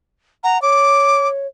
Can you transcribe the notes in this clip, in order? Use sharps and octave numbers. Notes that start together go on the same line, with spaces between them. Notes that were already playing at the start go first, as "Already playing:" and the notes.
F#5 A#5
C#5 D6